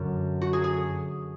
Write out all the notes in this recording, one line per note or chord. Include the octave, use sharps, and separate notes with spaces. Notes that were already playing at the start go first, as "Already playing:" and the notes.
Already playing: F#2 D3 D4 F#4
F#4
G#4
G#4